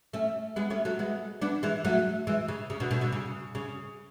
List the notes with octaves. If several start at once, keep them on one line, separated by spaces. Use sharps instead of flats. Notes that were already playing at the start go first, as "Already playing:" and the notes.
A3 C#4
G#3 B3
A3 C#4
F#3 A3
G#3 B3
B3 D4
E3 G#3
F#3 A3
E3 G#3
C#3
C#3
B2 D3
B2 D3
B2 D3
C#3
C#3